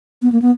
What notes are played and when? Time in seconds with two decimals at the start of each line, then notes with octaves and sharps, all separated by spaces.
0.22 B3
0.32 A#3
0.42 B3